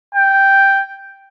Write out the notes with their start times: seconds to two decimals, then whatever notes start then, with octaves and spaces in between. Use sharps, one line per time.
0.15 G5